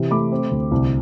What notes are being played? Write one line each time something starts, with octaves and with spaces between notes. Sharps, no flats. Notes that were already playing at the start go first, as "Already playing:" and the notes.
Already playing: C3 E3
A3 B5 D6
C4
D2
C2